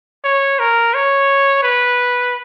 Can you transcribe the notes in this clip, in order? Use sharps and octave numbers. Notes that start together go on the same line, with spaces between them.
C#5
A#4
C#5
B4